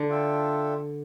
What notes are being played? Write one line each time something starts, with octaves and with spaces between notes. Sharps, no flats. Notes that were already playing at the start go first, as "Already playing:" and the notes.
Already playing: D3
D4 F4 A4 E5 G5